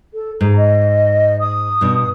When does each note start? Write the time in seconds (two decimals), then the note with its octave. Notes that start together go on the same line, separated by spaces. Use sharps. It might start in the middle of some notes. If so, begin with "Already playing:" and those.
0.13 A4
0.41 G#2 A#5
0.56 D#5
1.40 D#6
1.81 G2 B2